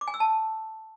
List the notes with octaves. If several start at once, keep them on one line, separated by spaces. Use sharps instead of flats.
D6
G#5
E6
A5